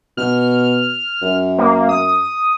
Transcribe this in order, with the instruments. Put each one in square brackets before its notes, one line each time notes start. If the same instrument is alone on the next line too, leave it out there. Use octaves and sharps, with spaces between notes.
[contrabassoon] B2 [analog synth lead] F6
[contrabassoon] F#2
[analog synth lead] A#3
D#6